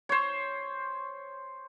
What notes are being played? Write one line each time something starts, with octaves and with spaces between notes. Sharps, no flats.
C5 C#5